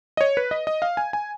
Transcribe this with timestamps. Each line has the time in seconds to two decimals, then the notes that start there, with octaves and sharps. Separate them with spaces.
0.17 D#5
0.21 C#5
0.37 B4
0.51 D#5
0.67 D#5
0.82 F5
0.97 G#5
1.13 G#5